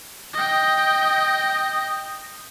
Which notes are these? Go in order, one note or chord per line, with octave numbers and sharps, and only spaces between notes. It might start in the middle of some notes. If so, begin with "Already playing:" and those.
D#5 G5